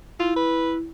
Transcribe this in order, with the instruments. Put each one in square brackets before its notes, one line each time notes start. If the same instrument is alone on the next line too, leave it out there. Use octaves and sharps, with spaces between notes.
[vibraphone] E4 [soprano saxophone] F4
[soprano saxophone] B4